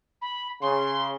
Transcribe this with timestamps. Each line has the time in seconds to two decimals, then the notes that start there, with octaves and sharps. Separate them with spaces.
0.22 B5
0.62 C#3 C6